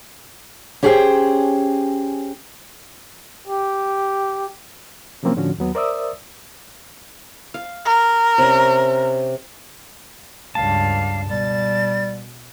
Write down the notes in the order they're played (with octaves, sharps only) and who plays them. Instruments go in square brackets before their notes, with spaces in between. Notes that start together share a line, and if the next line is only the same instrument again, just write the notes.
[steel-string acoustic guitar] C#4 G4 G#4 C5 F#5 G5
[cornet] G4
[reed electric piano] C3 F3 F#3 A#3 C4 C#4
A2 D3 F3 C#4 F#4
D#2 F#3 B3
A#4 C5 D5 E5 D#6 E6
[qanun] F5
[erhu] A#4
[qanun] C3 C#4
[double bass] C#2 G2 [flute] F5 [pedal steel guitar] A5
[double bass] B2 [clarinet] G3 [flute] A6